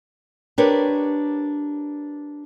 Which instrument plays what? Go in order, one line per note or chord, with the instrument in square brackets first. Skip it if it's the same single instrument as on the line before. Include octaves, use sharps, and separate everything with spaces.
[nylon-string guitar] D4 G4 A#4 B4 C#5